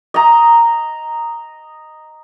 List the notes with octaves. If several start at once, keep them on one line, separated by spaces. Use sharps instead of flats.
D#5 A#5